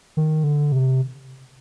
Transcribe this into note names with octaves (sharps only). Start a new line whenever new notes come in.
D#3
D3
C3